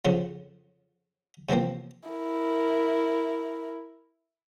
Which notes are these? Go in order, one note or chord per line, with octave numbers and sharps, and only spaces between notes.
F2 C#3 F3 F#3
C3 E3 F3 A#3 C4
E4 A#4